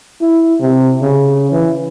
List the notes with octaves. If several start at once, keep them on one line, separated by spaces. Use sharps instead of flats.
E4
C3
C#3
E3